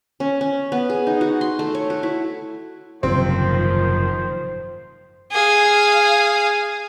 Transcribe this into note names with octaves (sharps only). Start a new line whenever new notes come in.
C#4
C#4
B3
G#4
D#4
F#4
C6
A3
C#5
F#4
E4
F#1 G#2 C3 D#3 F3 C4 C5
G#4 F5